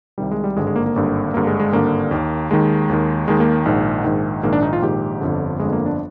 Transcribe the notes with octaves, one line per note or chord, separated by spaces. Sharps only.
C2 C3 D#3 G3
G#3
G3
G#1 G2 D3 G#3
G#3
A#3
A#3
G#1 G2 D3
G#1 G2 D3 A#3
G#3
G#3
G#1 G2 D3 A#3
D#2 D#3
D#2 D#3 G#3
D#2 D#3
D#2 D#3 G#3
A#3
A#1 G#2 D#3
A#1 G#2 D#3
A#1 G#2 D#3 A#3
D4
D#4
F4
A#1 G#2 D#3 G4
G1 F2 D3
G1 F2 D3 G#3
A#3
D4